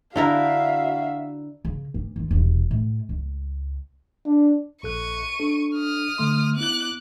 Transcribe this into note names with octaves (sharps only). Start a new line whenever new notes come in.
D3 E4 F#4 A#4 E5 F5
C#3
D2
D#3 F4
E1 C3
A2
C#2
D4
A#1 A4 C#6 F#6 D#7
D4 A4
D#6 F6
D3 A3 C6
B3 E4 D6 F#6